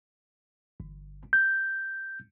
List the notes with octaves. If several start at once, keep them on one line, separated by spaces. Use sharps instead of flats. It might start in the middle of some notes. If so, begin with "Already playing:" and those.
G1
G6